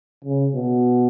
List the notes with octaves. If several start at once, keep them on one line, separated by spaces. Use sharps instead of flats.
C#3
B2